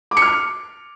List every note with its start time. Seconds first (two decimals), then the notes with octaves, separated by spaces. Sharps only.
0.11 D6
0.17 C#7
0.22 F6
0.27 C#7